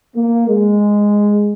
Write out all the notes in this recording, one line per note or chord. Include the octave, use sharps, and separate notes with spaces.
A#3
G#3